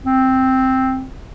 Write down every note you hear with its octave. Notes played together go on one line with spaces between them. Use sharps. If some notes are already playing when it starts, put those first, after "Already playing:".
C4